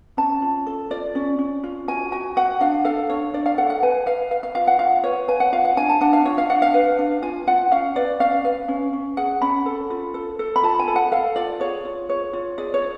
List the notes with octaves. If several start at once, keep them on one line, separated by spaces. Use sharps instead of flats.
C#4 A5
F4
A4
F4 D5
C#4
C#4
F4
F#4 G#5
F#4 G#5
F#4 F#5
D4 F5
A4 F5
D4 C#5
D4 D5
F5
A4 F#5
F#5
B4 G#5
B4 F5
B4 F5
F5
F4 F5
F#5
F4 F5
B4 C#5
B4 G#5
F#5
F4 F5
F#5
D4 G#5
A5
D4 F#5
F5
F4 C#5
F5
D4 F#5
F5
B4
D4
F4 G#5
F4 F#5
C#4 F5
B4 D5
C#4 F5
B4 F5
C#4
C#4
G#4 F#5
C#4 B5
A4
F4
A4
A4
B5
F4 A5
G#5
A4
F#5
A4 F5
F4 D5
G#4 C#5
F4
G#4 C#5
F4
G#4 D5
C#5
G#4